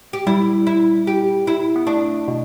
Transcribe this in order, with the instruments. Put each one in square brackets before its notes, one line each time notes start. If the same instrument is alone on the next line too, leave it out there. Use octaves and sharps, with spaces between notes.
[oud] G4
[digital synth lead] G3 [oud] E4
[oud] E4
G4
E4
[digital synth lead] B3
[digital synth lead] A3 [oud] D4
[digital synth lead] B2